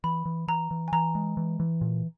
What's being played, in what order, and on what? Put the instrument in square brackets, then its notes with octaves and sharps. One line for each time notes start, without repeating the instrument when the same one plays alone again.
[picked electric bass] E3 [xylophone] B5
[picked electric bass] E3
[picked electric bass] E3 [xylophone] A#5
[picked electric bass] E3
[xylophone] G#5
[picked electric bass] E3 [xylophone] A#5
[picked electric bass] G#3
E3
E3
A#2